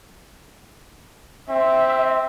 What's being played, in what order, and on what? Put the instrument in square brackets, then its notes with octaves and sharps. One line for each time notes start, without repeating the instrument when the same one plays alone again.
[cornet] C4 [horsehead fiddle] E5